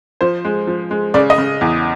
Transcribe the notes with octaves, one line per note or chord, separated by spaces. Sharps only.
F3 C5
G#3
F3
G#3
C#3 D5
D#5
C#3
E2